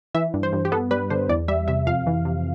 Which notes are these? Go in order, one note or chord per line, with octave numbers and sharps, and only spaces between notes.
E3 E5
G2
C5
G2
G4
B3 A4
G3 B4
D3 C5
E2 D5
G3 E5
C3 E5
F2 F5
E3
C3